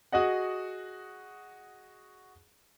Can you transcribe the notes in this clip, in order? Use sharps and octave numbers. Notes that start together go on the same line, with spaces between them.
F#4 G#4 D#5 F#5